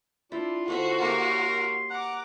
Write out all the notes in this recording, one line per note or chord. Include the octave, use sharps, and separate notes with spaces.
D4 E4 F4
D3 C4 F#4 E5 F5
A#3 C#4 G4 A#4 C6
F#5 A#5 D6